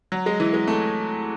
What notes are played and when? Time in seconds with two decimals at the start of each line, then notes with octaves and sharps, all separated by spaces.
0.12 F#3
0.26 G#3
0.40 E3
0.54 G#3
0.67 A3